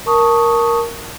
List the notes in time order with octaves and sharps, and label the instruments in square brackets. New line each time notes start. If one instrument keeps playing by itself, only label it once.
[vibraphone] A#4 A5 C#6 D#6